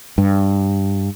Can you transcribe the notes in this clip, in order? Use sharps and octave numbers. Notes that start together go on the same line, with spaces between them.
G2